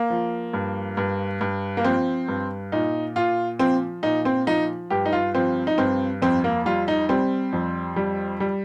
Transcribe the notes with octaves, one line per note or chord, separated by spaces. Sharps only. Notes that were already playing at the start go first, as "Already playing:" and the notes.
Already playing: A#3
F3
G2
G2
G2
A#3
F3 C4
G2
A#2 D#4
A#2 F4
F3 C4
A#2 D#4
C4
F3 D#4
G2 G4
D#4
F4
F3 C4
D#4
G2 C4
F2 C4
A#3
G3 F4
D#4
G3 C4
F2
G3
G3